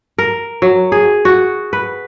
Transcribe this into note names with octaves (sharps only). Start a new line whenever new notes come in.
A#4
F#3
G#4
F#4
B4